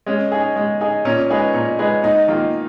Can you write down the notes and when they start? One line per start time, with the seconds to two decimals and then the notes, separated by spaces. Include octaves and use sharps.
0.06 G#3 C#4
0.32 D#4 G#4
0.56 G#3
0.81 D#4 G#4
1.05 A#2 C#4
1.30 G#3 D#4 G#4 B4
1.54 A#2
1.79 G#3 D#4 G#4 B4
2.03 G#2 D#4
2.28 D#3 A#3 F4